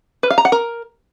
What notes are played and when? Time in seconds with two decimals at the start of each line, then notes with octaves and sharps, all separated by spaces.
0.23 B4
0.30 F5
0.38 A#5
0.45 F#5
0.52 A#4